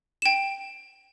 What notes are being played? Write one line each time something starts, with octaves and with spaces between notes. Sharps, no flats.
G5 E7